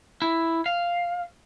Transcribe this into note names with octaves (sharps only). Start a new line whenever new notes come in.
E4
F5